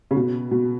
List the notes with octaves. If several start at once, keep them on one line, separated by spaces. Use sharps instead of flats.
C#3
B2
B2